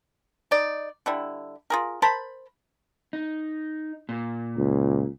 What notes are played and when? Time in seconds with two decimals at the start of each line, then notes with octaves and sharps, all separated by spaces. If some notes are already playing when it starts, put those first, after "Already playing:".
0.51 D#4 D5
1.06 D3 G3 E4
1.70 F4 G#4 A#4
2.02 A#4 C5 A5 B5
3.13 D#4
4.09 A#2
4.57 C#2